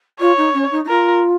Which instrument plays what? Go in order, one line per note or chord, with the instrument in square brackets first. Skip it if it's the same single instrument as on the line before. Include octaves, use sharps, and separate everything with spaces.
[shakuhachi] F4 [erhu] C#5
[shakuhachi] D#4
C#4
D#4
D#4
[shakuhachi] F4 [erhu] A#4